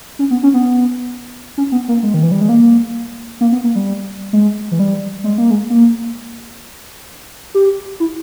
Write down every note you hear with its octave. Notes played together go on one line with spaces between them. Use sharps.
C#4
B3
C#4
B3
C#4
B3
A#3
G#3
D#3
E3
G3
G#3
A#3
A#3
B3
A#3
G3
G#3
E3
G3
G#3
A#3
G#3
A#3
G4
E4